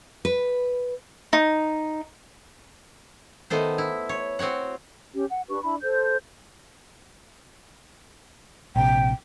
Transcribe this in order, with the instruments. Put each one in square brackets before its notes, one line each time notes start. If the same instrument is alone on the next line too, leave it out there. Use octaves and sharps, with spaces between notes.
[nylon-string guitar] B4
[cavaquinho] D#4
[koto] D#3 A3 B3 C5
E4
C#5
C4 F#4 C#5 F#5
[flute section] C#4 G4
F#5
D4 G4 B4 C#6
D4 E4 B5
A4 C5 G6
[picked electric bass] A#1 C3 [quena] G5